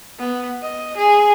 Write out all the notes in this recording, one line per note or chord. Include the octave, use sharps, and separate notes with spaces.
B3
D#5
G#4